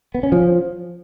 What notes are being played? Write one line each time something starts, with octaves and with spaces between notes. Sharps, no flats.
B3
C#4
F3